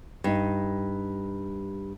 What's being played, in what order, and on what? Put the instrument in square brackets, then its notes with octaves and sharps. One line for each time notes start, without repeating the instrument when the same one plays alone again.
[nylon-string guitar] G2 D#4